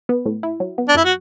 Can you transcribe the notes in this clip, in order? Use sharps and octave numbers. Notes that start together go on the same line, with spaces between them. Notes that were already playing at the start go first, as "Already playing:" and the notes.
B3
A2
E4
F#3
B3
D4
F#2 E4
F#4